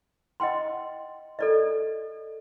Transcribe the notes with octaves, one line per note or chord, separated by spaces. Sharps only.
D#5 F#5 G5 C6
A4 D5 D#5